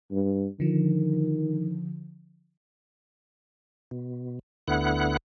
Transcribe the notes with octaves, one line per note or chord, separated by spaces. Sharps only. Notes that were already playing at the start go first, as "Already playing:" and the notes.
G2
D3 D#3 F3
B2
D2 D3 B3 E4 F#5 F#6